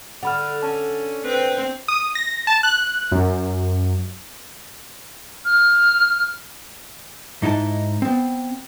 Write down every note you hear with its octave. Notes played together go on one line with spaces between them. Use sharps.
D3 F#5 B5 F6
C#4 A5
C4 B4
D#6
A#6
A5
F#6
F#2
F6
G#2 D#4 E4 A4 A5
B3 C4